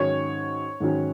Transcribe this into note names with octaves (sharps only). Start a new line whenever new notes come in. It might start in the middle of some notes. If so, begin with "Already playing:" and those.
Already playing: G#2 D#3 F#3 C#4 C#5
G#2 D#3 F#3 C#4